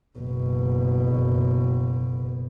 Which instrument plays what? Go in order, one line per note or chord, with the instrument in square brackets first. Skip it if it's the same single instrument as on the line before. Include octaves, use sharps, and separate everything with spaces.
[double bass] F#1 B2